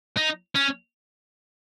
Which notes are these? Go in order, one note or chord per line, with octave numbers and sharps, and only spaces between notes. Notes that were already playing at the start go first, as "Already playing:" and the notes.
D#4
C#4